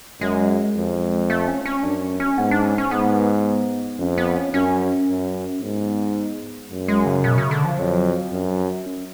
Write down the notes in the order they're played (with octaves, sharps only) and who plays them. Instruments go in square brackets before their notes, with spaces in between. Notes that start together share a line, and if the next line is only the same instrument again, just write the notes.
[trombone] F#2 [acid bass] G#3
[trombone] F2
[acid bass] A3
C#4
C#4
[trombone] F#2 [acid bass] D4
[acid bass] C#4
C#4
[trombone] G#2 [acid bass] B3
[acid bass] D4
C#4
C#4
[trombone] G#2 [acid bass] B3
[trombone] F2 [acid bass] C#4
[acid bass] B3
C#4
[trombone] F#2 [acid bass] C#4
[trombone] F#2
[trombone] G#2 [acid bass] B3
[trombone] F#2 [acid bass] A3
[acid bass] G#3
C#3
B2
C#3
D3
F3
[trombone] F2 [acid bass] F#3
[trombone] F#2
[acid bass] C#4